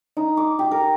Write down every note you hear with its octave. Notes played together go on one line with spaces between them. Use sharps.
D#4
D6
G4
A#4